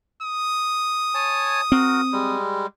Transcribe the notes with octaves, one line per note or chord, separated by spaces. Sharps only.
D#6
C#5 G#5 A5
C4 F#4 A#4
G3 G#3